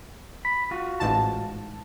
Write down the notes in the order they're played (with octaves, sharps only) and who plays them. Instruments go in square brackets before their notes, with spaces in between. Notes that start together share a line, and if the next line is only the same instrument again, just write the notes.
[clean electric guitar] B5
F4 F#4
[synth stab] A1 G#2 A5